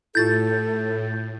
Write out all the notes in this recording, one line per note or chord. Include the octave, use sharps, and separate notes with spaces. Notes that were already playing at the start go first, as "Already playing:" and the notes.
A2 E4 F4 G4 A4 G6 A6